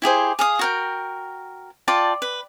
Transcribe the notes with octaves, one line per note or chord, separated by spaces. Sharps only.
E4 G4 G#4 C5
G#4 F5 D#6
F#4 A#4 G5
F4 D5 G5 A5
B4